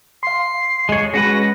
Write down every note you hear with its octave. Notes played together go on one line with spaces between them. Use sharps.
F5 C6 C7
E2 G#3 C#5
G#3 C#4 F#4 G#4 B4 A#6